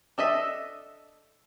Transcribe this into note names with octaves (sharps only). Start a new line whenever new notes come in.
D4 A4 D#5 E5